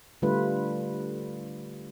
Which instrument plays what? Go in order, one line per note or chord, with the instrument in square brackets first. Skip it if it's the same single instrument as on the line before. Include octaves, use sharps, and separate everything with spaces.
[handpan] D3 G3 A3 F4 B4